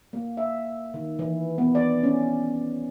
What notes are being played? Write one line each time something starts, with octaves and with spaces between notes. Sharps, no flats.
A#3
E5
D#3
E3
B3
D5
C#4